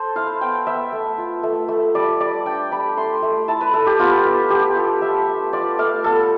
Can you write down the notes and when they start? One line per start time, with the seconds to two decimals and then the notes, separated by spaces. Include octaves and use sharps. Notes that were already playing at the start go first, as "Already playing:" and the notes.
Already playing: A4 C5
0.15 E4 F5
0.41 B3 G5
0.67 B3 E5
0.92 A3
1.18 F4
1.43 A3
1.68 A3
1.95 G3 D5
2.20 G3 D5
2.46 D4 G5
2.72 G3 B5
2.97 A3 C6
3.22 A3
3.48 E4 A5
3.61 B4
3.74 E4 A4
3.87 G4
3.99 B3 F4
4.25 B3
4.50 B3 G4
4.76 F4 A4
5.02 A3 E5
5.28 A3
5.53 F4 D5
5.79 A3 F5
6.04 B3 A4